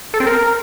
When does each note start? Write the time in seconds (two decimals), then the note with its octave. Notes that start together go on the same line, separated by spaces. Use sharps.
0.14 A4
0.20 C4
0.27 A#4